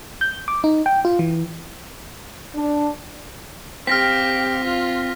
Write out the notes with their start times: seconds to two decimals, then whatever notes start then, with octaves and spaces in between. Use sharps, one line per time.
0.21 G6
0.48 D6
0.64 D#4
0.86 G5
1.05 F4
1.19 E3
2.56 D4
3.87 C4 G4 F5 F6 A#6 B6
4.63 F4